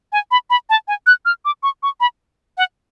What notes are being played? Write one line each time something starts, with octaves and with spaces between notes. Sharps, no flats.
G#5
B5
B5
A5
G#5
F#6
F6
D6
C#6
C#6
B5
F#5